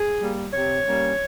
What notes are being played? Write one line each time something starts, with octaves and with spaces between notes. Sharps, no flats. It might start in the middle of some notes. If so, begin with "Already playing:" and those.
Already playing: G#4
G3 A#3
C3 C#5
G3 A#3 C#4